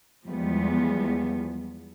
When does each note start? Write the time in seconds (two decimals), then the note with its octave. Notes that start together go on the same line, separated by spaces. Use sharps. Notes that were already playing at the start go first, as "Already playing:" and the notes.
0.25 E2 F3 G3 G#3 B3